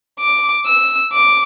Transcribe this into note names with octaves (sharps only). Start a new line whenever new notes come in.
D6
E6
D6